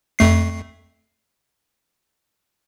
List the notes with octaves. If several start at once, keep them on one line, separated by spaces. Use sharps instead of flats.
F2 A3 C7